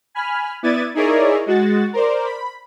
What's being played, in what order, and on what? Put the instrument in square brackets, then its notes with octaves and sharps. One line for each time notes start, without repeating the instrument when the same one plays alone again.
[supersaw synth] G#5 B5 F6
B3 E4 D5 G#6 A6 D#7
D#4 E4 G#4 A#4 C#5 D5
G#3 F#4 A6
A#4 C5 D5
B5